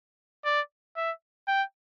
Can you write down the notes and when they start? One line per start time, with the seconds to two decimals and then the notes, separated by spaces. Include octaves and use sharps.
0.45 D5
0.96 E5
1.48 G5